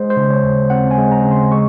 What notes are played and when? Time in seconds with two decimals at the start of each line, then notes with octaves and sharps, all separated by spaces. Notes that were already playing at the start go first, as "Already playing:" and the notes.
Already playing: G#3 C5
0.10 C5
0.17 C#3
0.30 C#5
0.43 D#2
0.70 C4 F#5
0.91 G#5
0.98 G#3
1.12 A#5
1.25 C#3
1.31 C6
1.52 G#3 C#6